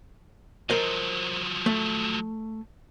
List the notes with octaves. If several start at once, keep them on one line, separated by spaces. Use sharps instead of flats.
F3 F#3 A#4 C5 D#5
A3